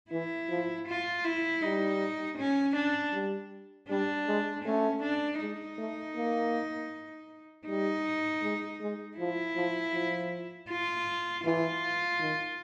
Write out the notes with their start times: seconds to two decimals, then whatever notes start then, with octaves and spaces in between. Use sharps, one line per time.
0.11 E3 E4
0.49 F3
0.87 F4
1.25 E4
1.62 G3 D#4
2.38 C#4
2.76 D4
3.13 G3
3.89 G3 D4
4.27 G#3
4.64 A3 C#4
5.02 D4
5.39 G#3 D#4
5.78 A3
6.16 A#3
7.67 G3 D#4
8.42 G#3
8.80 G#3
9.17 F3 E4
9.55 F3
9.93 F3
10.69 F4
11.44 E3 F4
12.20 D#3